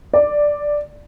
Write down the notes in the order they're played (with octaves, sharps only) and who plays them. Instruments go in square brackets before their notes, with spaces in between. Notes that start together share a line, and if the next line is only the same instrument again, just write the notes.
[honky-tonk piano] D5